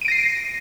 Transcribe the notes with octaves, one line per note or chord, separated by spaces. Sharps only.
A#6 C7 D7 D#7